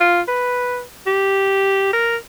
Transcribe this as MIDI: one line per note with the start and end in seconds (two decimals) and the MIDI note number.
0.01 0.22 65
0.28 0.82 71
1.07 1.90 67
1.93 2.16 70